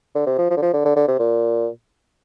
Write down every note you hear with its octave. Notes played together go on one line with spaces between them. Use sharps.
D3
C3
F3
F3
D3
F3
D3
D3
D3
C3
A#2